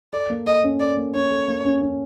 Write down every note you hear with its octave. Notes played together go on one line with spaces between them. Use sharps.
A4 D5
A#3
A4 D#5
C#4
A4 D5
A#3
C#4 C#5
A4
A#3
C#4
C#4